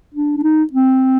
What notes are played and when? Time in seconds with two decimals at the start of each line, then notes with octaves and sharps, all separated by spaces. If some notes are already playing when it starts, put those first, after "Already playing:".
0.14 D4
0.37 D4
0.43 D#4
0.73 C4